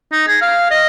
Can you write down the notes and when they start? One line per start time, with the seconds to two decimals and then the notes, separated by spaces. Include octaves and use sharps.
0.12 D#4
0.28 G#4
0.42 F5
0.71 D#5